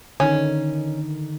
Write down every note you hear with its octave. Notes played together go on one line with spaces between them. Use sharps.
D3 D#3 C#4 D#4